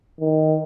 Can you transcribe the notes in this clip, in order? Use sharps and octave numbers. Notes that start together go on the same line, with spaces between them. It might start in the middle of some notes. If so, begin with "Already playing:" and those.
D#3